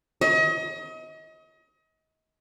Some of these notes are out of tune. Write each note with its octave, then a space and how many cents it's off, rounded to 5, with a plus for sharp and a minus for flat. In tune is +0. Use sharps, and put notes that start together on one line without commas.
D#5 +35